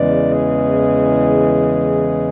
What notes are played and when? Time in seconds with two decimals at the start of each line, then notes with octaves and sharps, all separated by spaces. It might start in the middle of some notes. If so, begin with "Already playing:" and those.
Already playing: E2 C#3 E3 G#3 D5
0.31 G#4